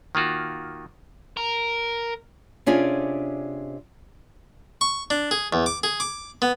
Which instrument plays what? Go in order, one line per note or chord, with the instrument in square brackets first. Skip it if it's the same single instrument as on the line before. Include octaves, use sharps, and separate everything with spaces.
[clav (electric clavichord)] D#3 A#3 F4 F#4
[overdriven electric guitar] A#4
[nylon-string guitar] C3 C#4 D4 F4 G#4
[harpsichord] C#6
D4
G#4
E2
D6
G#4
D6
B3